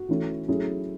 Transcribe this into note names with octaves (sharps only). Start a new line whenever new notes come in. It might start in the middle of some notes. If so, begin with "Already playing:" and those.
Already playing: F#4
E3 A3 C#4 E4
F#3 A3 C#4 E4 G#4